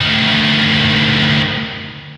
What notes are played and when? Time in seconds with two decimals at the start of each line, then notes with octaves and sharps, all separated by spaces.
0.01 D2 D#3